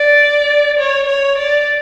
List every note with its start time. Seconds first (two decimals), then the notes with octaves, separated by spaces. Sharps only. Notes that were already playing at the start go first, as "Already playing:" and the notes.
Already playing: D5
0.79 C#5
1.08 C#5
1.38 D5